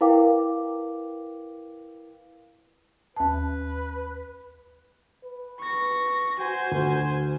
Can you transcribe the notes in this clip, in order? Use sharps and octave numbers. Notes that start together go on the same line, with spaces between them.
E4 A#4 B4 F5 G5 D6
D#2 B4 A5
B4
C#6 A#6
F#4 C5 G#5
D2